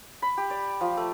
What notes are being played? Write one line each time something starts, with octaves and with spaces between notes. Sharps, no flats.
B5
G4
D5
F3
A3